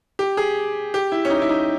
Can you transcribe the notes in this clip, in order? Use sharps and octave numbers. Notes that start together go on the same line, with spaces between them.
G4
G#4
G4
E4
C#4
D#4
E4
D#4